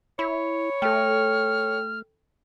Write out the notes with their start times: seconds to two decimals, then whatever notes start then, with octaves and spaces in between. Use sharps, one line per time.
0.19 E4 C#5 B5
0.82 A3 A4 G5 F6